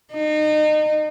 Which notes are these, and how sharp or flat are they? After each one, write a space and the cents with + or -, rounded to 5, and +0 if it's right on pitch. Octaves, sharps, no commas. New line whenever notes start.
D#4 -30